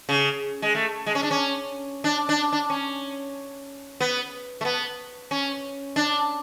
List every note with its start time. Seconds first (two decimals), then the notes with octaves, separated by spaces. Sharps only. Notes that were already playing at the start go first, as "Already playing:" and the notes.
0.09 C#3
0.62 G#3
0.75 A3
1.06 G#3
1.15 C#4
1.23 D4
1.31 C#4
2.04 D4
2.29 D4
2.53 D4
2.70 C#4
4.00 B3
4.61 A3
4.65 B3
5.31 C#4
5.96 D4